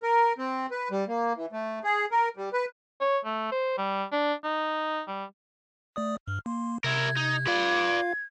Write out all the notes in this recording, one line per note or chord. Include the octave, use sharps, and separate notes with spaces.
A#4
C4
B4
G3
A#3
E3
A3
G#4
A#4
G3
B4
C#5
A3
C5
G3
D4
D#4
G3
A3 D5 D#6
G2 F6
A#3 C6
C3 E4 A#4 G#6
D#4
F4 B4 D5 F5